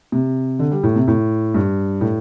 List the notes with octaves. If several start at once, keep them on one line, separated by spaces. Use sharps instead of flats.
C3
D3
G3
A2
C3
A2
G2
A2